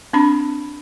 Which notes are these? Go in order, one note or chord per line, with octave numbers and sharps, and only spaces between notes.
C4 D4 B5